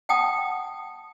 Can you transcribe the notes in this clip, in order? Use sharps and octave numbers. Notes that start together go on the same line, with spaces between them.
F#5 G5 A5 D#6